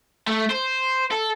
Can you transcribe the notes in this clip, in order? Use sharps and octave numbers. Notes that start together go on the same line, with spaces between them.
A3
C5
A4